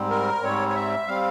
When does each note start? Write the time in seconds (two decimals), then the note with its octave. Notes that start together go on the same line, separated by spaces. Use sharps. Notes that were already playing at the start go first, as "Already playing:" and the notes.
Already playing: G#2 G3 C4
0.10 A#4
0.43 G#2 G3 C4 C#5
0.68 C#5
0.75 E5
1.07 G3 C4 F5